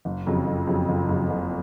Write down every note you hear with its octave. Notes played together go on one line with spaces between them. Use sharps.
F#1
F2 C#3 F#3
F#1
F2 C#3 F#3
F#1
F2 C#3 F#3
F#1